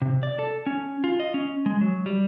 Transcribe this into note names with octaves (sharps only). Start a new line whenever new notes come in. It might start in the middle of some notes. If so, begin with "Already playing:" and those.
C3
D5
A4
C#4
F4
D#5
C#4
G#3
F#3
G3